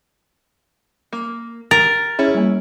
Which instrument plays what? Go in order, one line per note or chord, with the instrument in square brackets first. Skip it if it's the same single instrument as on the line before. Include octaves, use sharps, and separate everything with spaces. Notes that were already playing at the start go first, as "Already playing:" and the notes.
[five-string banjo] A#3
[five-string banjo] G4 [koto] A#4 [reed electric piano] A6
[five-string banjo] C#4 E4 [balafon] G#4
[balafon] G3 A#3